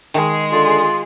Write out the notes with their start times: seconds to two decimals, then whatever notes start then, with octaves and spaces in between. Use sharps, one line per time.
0.14 D#3 G#3 G#4
0.53 D3 F4